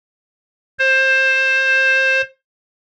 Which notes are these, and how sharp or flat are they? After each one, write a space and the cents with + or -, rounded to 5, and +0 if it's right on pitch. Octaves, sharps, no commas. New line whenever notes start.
C5 +20